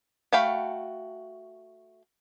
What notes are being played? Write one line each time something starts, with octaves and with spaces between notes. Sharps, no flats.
A3 F#4 F5 G5 B5